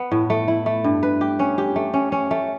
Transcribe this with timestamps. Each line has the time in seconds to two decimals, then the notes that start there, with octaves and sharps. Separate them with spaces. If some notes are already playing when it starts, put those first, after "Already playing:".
Already playing: B3
0.11 A2
0.30 A3
0.48 E4
0.66 A3
0.84 G2
1.03 B4
1.21 G4
1.39 C#4
1.58 G4
1.76 A3
1.94 C#4
2.12 C#4
2.31 A3